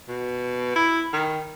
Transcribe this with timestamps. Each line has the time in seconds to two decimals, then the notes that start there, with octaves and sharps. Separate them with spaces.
0.08 B2
0.76 E4
1.13 D#3